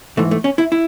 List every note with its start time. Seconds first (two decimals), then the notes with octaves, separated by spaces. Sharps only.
0.17 G#2 E3 A3
0.31 A3
0.44 C#4
0.58 E4
0.72 E4